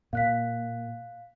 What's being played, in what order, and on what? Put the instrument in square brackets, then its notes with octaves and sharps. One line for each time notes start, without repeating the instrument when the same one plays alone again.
[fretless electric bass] A#2 [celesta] F5 F#6 B6